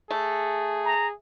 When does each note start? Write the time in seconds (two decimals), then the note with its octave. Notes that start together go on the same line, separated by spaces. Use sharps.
0.11 A3 G#4
0.85 A#5